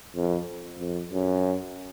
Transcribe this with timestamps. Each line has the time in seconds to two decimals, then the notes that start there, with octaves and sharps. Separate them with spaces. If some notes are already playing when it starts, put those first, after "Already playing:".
0.15 F2
0.79 F2
1.11 F#2